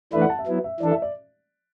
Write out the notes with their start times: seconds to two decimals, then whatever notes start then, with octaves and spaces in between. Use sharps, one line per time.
0.13 E3 A3 D4 B4 E5
0.22 F#5
0.30 A5
0.39 E5
0.46 F#3 B3 E4
0.64 E5
0.80 E3 D4 A4 D5
0.91 E5
1.02 D5